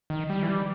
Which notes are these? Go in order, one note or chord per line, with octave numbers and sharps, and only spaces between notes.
D#3
G3
E3
G3